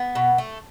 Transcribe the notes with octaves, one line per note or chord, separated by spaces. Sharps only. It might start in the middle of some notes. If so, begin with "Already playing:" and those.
Already playing: B3
B2
A3